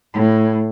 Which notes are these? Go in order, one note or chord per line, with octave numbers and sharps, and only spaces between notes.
A2